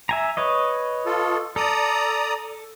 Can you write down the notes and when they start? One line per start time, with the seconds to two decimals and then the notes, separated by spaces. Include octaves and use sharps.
0.09 E5 G#5 A#5
0.37 B4 C#5 D#5
1.06 F4 A4
1.56 A4 D5 A#5 D#6